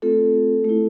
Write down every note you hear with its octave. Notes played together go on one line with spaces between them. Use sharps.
A3 C4 F4 A4
A3 E4